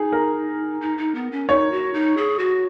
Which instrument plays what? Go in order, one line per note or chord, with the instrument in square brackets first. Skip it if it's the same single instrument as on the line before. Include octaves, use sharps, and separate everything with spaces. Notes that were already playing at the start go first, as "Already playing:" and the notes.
Already playing: [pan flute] D#4 [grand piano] G#4
[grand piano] A#4
[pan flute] D#4
D#4
B3
C#4
[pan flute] D#4 [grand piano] C#5
[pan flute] F#4
D#4
G#4
F#4